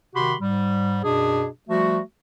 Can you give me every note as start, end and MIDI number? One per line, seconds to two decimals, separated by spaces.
0.15 0.35 48
0.15 0.35 51
0.15 0.35 66
0.15 0.35 67
0.15 0.35 83
0.15 0.35 84
0.40 0.99 44
0.40 0.99 55
1.04 1.46 42
1.04 1.46 47
1.04 1.46 62
1.04 1.46 68
1.69 2.00 53
1.69 2.00 55
1.69 2.00 57
1.69 2.00 66